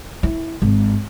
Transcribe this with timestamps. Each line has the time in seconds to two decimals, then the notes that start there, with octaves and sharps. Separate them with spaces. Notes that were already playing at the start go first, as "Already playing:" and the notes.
0.23 E4
0.62 G#1